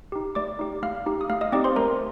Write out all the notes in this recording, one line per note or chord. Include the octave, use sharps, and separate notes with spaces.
D#4 G4
A3 D5 D6
D#4 G4
A3 F5 F6
D#4 G4
D#6
A3 F5 F6
D#5 D#6
C4 D#4 G4 D5 D6
C5 C6
A3 A#4 A#5